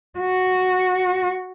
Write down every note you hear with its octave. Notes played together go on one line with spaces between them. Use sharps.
F#4